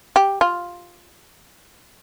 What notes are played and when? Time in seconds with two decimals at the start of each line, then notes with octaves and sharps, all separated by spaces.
0.16 G4
0.41 F4